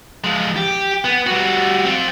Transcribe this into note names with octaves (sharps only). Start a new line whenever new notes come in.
F3 G#3
G4
B3
G3 F#4
C4 F4